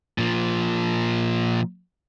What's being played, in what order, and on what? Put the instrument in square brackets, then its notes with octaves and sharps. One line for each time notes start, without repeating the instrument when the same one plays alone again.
[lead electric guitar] A#2 F3